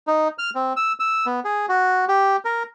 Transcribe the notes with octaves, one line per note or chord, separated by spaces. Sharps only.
D#4
F6
C4
E6
E6
B3
G#4
F#4
G4
A#4